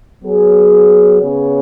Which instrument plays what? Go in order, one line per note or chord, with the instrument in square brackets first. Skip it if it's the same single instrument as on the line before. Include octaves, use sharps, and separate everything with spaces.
[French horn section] F#3 B3 G#4 C#5
C#3 B3 G#4 C#5